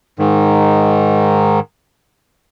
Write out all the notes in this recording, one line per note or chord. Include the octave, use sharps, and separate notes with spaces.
G#2 D#3